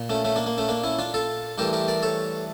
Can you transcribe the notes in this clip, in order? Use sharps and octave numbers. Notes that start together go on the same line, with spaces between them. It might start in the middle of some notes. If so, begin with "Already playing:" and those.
Already playing: A#2
A3 C#4
A3 C#4
A#3 D4
A#3
A3 C#4
A#3 D4
C#4 E4
D4 F4
F4 A4
G2 E3 A3 G4 A#4
G4 A#4
A#4 D5
A4 C#5